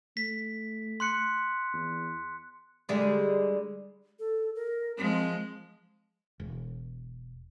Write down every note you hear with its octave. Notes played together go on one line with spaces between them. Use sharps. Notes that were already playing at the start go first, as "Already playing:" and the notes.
A3 B6
C6 F#6 C#7
E2
D3 G3 G#3
A4
A#4
F3 G#3 C4
E1